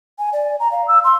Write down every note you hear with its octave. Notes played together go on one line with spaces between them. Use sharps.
G#5
D5
A#5
F5
E6
C6